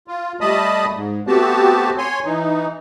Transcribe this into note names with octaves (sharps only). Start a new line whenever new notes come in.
F4
G3 A3 D#5 A5 B5 D#6
G#2
A3 B3 C4 F#4 G4 A5
C#5 G#5 C6
E3 D#4